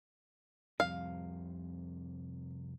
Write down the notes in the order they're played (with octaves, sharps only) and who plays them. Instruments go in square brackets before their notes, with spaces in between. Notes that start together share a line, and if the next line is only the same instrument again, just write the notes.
[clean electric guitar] C2 F2 C3 [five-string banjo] F5